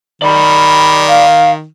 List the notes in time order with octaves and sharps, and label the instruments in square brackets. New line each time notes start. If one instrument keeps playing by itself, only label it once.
[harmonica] D#3 [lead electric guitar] D5 B5
[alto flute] F5